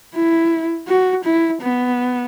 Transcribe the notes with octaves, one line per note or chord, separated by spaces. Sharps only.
E4
F#4
E4
B3